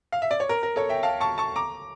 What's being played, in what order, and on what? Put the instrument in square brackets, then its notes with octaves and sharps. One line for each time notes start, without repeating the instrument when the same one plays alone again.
[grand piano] F5
E5
D5
C#5
A#4
A#4
A4 C#5
E5 G5
F5 A5
A5 C#6
A5 C#6
A#5 D6